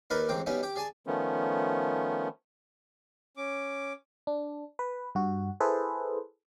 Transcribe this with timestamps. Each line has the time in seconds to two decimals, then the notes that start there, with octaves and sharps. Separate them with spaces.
0.10 D#2 D#4 A#4 B4 D5 B5
0.29 A1 G#2 C4 G5 D6
0.46 B2 G3 B3 C#4 D#4
0.63 G4 G5 D6
0.76 G#4 D5 G#5 A5
1.07 D#3 F3 A3 B3 C#4
3.37 C#4 D6
4.27 D4
4.79 B4
5.15 G2 F#4
5.60 E4 G#4 A4 B4 C5